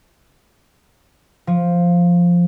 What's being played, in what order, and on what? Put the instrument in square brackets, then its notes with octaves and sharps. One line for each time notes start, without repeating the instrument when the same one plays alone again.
[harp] F3